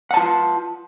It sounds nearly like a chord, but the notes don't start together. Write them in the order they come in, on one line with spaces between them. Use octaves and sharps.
F#5 A5 F4